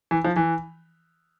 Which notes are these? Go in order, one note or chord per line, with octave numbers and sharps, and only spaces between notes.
E3
F3
E3